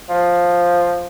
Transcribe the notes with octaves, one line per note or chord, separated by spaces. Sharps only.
F3